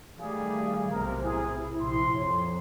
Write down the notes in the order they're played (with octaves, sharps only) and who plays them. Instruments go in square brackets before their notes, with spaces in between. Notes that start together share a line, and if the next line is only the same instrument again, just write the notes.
[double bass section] D#3 G3 A3 [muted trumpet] G#4 [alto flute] F5
[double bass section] B1 A2 C3 [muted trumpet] A#4
[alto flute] E4 [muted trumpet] G#4
[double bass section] A#1 C3 [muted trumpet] C6
[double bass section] F2 [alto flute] C#5